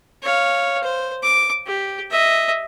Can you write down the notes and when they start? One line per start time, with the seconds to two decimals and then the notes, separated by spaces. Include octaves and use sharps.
0.22 C#5 F5
0.83 C5
1.23 D6
1.67 G4
2.10 D#5 E5